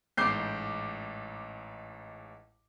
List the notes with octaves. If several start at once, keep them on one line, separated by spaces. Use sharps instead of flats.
A1 G#2 D6 G6 C7